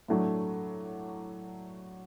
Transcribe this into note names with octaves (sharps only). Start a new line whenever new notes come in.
A2 F#3 A3 D4